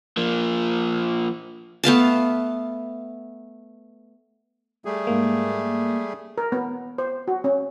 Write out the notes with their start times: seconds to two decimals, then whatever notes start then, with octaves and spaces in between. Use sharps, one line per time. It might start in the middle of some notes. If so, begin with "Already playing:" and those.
0.17 F3 A#3
1.84 A3 B3 F5 A5
4.85 G3 A3 G#4
5.07 G#2 A#3
6.38 A#4
6.52 B3
6.98 C5
7.28 F#4
7.44 C#4